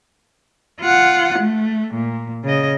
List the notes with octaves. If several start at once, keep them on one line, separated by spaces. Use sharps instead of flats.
F4 F#5
A3
A#2
C#3 D#5